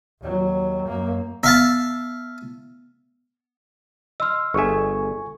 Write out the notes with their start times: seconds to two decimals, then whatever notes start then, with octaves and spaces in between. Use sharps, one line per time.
0.21 D#2 F#3
0.87 F#2 A#3
1.43 B3 E5 F5 A5
4.20 D#5 C6 E6 F6
4.54 G1 G#4 A4 E5 G#5 C#6